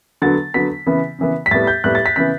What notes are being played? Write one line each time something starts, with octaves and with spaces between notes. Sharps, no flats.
D3 F#3 B3 A6
D3 F#3 B3 B6
C#3 E3 B3
C#3 E3 B3
B6
A2 G3 B3 A6
G6
A2 G3 B3 F#6
A6
B6
C#3 E3 B3 B6